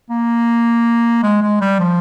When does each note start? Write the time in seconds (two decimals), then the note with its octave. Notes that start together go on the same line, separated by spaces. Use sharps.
0.10 A#3
1.23 G#3
1.42 G#3
1.61 G3
1.79 F3